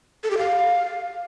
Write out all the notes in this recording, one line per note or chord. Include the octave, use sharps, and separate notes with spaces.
A4
G4
F5